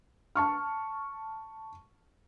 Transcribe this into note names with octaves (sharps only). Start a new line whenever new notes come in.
A5 C#6 F6